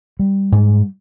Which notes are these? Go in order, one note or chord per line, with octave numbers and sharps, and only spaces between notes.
G3
G#2